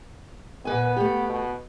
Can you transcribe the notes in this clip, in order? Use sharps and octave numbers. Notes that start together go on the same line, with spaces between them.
A#2 B3 B4 G#5
A3 G4
B2